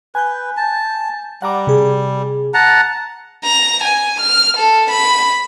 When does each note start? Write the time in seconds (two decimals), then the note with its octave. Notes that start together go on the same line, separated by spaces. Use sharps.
0.15 B4 G#5 G6
0.57 A5
1.42 G3 F#5 A#5 D6
1.67 C3 G#4
2.54 F#5 A5 A#5
3.44 A#5
3.84 G#5
4.20 F6
4.57 A4
4.91 B5